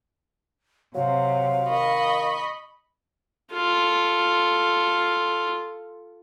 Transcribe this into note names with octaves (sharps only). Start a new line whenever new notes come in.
C3 F#3 F5
D#3 D#5 B5 C#6
F4 A4